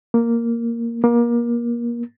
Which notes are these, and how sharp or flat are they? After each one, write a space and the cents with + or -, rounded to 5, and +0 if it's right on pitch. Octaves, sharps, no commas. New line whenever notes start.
A#3 -5
A#3 +25